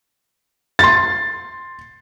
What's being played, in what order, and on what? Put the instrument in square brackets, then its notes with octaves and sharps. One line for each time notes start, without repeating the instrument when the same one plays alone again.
[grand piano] C6 A6